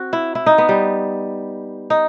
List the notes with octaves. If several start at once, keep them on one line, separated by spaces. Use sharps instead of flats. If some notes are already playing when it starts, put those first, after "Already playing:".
Already playing: C4 F#4
E4
E4
D#4
B3
G3
D#4